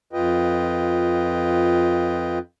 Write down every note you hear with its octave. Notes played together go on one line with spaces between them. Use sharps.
F2 F4 B4 D#5 G5